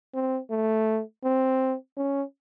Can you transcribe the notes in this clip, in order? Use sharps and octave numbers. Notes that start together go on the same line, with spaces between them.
C4
A3
C4
C#4